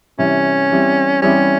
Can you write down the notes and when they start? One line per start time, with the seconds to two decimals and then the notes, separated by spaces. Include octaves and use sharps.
0.18 C3 E3 G3 C#4
0.71 E3 G3 C4
1.22 E3 G3 C4 C#4 E4 G4